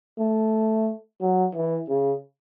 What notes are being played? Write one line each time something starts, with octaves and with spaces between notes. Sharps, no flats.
A3
F#3
E3
C#3